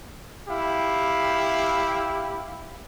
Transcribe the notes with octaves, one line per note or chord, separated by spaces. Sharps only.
E4 G4 F5